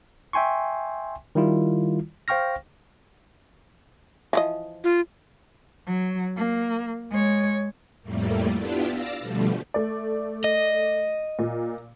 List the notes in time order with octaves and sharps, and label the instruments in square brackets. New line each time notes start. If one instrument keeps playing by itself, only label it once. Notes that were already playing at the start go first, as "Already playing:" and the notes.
[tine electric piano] E5 G5 G#5 C6 C#6
D#3 G3 E4 F4
C5 F5 G5 C#6 F6 A#6
[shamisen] E3 F3 D#5
[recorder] F4
[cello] F#3
A#3
G#3 C#5
[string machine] F2 A2 G3 A3 A#3
B3 D4 E4 F4 G4
D5 F5 E6 A#6
B2 D3 F3 G3 A3
[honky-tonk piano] A3 D5
[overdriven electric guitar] D#5
[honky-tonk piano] A#2